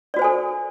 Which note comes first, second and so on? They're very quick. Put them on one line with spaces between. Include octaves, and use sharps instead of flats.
D5 F#4 C5 G#5 A4